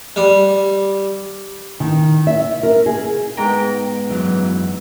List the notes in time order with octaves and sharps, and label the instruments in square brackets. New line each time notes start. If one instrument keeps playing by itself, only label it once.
[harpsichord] G3
[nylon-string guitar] D#3
E5
A#4
G#4
[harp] G#2 A#5 [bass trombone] B3 [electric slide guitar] G5
[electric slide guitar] F#2 E3 F#3